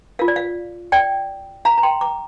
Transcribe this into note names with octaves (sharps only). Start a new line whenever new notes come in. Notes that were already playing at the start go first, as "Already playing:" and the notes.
F4 A#4 F5
D5
F5
D5 G5
F5 A#5
A#5
G5 C6
A#5 D6